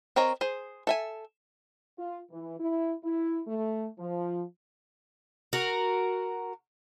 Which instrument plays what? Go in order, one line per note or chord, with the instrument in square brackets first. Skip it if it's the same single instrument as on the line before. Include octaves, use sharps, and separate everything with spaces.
[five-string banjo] C4 A#4 C#5 D#5 A#5
G#4 C5
A4 E5 G#5
[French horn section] F4
E3
E4
E4
A3
F3
[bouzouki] F#4 A#4